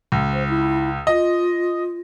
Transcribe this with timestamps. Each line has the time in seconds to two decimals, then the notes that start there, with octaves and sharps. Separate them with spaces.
0.12 C#2
0.33 C5
0.49 E4
1.07 F4 D#5